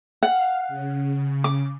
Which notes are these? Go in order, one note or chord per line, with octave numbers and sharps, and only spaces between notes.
F5 F#5
C#3
D6